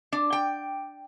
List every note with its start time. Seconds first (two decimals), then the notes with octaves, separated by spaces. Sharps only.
0.12 D4
0.32 G5